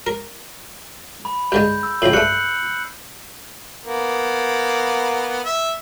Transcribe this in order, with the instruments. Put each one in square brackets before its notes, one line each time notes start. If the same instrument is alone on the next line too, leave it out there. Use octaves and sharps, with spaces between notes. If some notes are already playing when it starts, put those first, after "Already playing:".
[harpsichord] A#4
[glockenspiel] B5
[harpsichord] G2 D3 G#3 [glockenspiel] G6
[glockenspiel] E6
[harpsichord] C#2 A2 [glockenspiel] G6 C7 F#7
[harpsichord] G2 A3 [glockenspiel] F#6 C#7
[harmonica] A#3 B3
E5